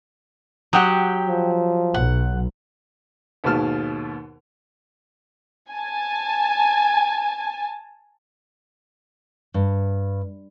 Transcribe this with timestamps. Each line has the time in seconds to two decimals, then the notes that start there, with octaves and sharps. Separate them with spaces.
0.73 F#3 G4 F#5 G5 D#6
1.30 F3
1.94 B1 F#5
3.44 D#2 G#2 B2 A5 F6
5.71 G#5 A5
9.54 G2